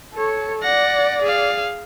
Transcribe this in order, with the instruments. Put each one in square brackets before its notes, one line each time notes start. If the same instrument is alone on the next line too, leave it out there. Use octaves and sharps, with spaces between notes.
[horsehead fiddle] A4 C#5
[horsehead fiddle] D5 [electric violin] F#5 A#6
[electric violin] G#4 F5